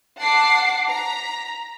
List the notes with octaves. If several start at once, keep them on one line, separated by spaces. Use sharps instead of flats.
F#5 A5 D6 C7
A#5 B6